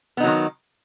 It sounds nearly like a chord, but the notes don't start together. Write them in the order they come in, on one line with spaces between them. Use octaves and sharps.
B3 D#4 F#3 D#3